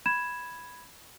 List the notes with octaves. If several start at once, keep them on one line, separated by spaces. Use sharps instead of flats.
B5 G#6 E7